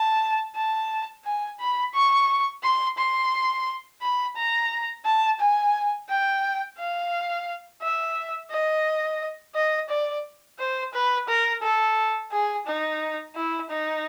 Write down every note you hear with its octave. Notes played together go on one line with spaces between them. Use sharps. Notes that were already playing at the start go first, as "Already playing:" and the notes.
Already playing: A5
A5
G#5
B5
C#6
C6
C6
B5
A#5
A5
G#5
G5
F5
E5
D#5
D#5
D5
C5
B4
A#4
A4
G#4
D#4
E4
D#4